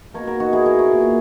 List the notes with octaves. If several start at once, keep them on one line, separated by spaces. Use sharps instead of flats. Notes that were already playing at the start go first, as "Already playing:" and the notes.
B2 A#3 A#4 C#5
F#4 A#4
D#4 F#4
E4 G#4
F#4 A#4
A#4 C#5
A#2 A#3